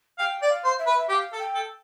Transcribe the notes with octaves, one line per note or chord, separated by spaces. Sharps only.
F5 G5
D5
F5
C5
E5
B4
E5
G4 G5
F5
A4
G5
A4